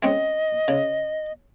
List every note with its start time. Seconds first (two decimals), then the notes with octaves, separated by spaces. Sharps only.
0.03 G#3 C4 C#4 D#5
0.68 C#3